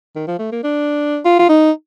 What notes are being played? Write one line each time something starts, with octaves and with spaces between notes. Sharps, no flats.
D#3
F3
A3
A#3
D4
F4
F4
D#4